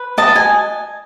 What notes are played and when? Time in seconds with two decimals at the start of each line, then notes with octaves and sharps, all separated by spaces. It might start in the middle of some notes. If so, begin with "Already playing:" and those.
Already playing: B4
0.18 D#5 A5
0.36 G#5